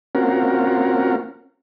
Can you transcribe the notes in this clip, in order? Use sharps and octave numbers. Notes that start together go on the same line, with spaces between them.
A#3 C4 C#4 F4 F#4 A#4